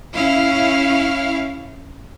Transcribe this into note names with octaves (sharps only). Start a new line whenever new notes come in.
C#4 E4 F5